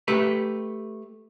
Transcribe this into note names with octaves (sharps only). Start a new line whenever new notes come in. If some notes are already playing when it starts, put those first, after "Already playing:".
A3 G4 B4